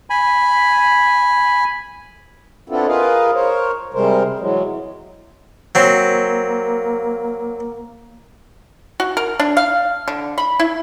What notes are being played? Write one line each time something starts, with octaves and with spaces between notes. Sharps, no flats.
G#5 B5
B3 C4 D4 E4 F4 A4
F4 G#4 A#4 B4 D#5 F5
A#4 C5 C#5
C3 G3 G#3 A#4 C5
E3 F#3 G#3
F#3 A#3 C4
F#4
A#4
D4
F5
D3
B5
E4